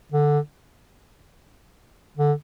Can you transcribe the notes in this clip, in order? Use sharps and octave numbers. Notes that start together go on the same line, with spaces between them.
D3
D3